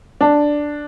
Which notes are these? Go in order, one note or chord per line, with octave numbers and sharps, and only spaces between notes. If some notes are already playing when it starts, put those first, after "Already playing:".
D4